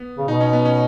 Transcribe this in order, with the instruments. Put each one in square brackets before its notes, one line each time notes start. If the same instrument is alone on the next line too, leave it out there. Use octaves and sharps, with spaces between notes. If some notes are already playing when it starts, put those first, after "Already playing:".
Already playing: [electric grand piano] B3
[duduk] C#3
[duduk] B2 [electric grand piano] D#4
[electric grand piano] C#4
B3
C#4